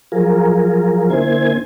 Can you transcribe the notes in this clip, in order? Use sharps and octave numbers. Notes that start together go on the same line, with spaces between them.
F3 F#3 F4 G#4 A#4
D3 A#3 E4 C5 G#5 G#6